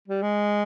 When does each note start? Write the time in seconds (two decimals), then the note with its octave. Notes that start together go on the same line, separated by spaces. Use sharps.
0.08 G3
0.22 G#3